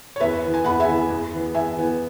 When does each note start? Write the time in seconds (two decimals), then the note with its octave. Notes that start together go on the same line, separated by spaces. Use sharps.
0.16 C#5
0.20 E2 B4 E5
0.42 E3 B3
0.54 G#5
0.64 E2 F#5 B5
0.80 E5 G#5
0.88 E3 B3
1.10 E2
1.32 E3 B3
1.54 E2 E5 G#5
1.77 E3 B3